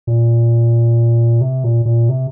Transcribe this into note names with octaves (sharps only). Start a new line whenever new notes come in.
A#2
C3
A#2
A#2
C3